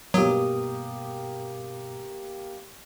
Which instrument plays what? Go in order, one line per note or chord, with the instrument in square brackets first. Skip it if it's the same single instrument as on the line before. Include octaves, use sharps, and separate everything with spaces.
[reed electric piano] G2 B2 D#6 [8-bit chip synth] F#3 [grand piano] A#3 G4